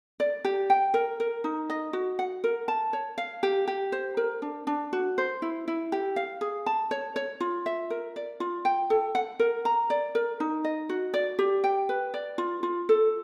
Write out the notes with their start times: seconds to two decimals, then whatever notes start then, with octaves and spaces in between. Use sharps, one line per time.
0.20 D5
0.45 G4
0.70 G5
0.94 A#4
1.20 A#4
1.44 D#4
1.70 D#5
1.93 F#4
2.19 F#5
2.44 A#4
2.68 A5
2.93 C#5
3.18 F5
3.43 G4
3.67 G4
3.92 C5
4.17 A#4
4.42 D4
4.67 D4
4.93 F#4
5.18 C5
5.42 E4
5.68 E4
5.92 G4
6.16 F5
6.41 G#4
6.66 A5
6.91 C#5
7.16 C#5
7.40 F4
7.66 E5
7.90 A#4
8.16 D5
8.40 F4
8.65 G5
8.90 A4
9.15 F#5
9.40 A#4
9.65 A#5
9.90 D5
10.15 A#4
10.40 D#4
10.64 D#5
10.89 F#4
11.14 D5
11.39 G4
11.64 G5
11.89 B4
12.14 D5
12.38 F4
12.63 F4
12.89 A4